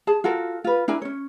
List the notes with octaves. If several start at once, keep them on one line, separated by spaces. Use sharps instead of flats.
G#4 A5
F4 F#4 A4 A#4
F4 B4
D4 E4 A#4 G#5
C#4 C#5